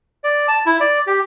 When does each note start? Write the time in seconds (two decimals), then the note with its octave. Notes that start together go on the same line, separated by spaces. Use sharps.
0.24 D5
0.48 A5
0.66 E4
0.80 D5
1.07 G4